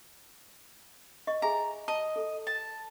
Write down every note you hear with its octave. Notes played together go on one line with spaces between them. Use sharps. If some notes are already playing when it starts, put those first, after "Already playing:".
D#5 C#6
G#4 E5 G#5 A#5
D#5 A5
A4
A5